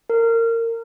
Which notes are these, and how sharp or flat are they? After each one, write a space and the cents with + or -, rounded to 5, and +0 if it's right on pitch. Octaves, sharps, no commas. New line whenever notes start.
A#4 -25